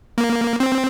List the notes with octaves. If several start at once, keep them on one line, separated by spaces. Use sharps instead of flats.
A#3
C4